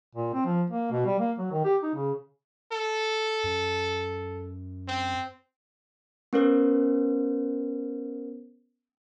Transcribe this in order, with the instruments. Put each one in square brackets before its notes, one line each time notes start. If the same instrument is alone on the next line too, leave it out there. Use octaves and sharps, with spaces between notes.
[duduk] A#2
C4
F3
A#3
B2
G3
A#3
F#3
D#3
G4
D#4
C#3
[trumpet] A4
[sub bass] F#2
[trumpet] C4
[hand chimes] B3 C#4 A#4 C5